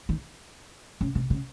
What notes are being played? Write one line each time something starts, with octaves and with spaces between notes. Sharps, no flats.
D#3
C#3
C3
C#3